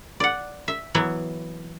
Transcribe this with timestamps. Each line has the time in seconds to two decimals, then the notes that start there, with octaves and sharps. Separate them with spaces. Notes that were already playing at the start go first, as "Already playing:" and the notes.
0.20 D5 F#5
0.68 E5
0.95 E3 F#3 B3 E4